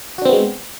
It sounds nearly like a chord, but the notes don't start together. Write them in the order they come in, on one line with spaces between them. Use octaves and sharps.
F#4 D4 C4 B3 G#3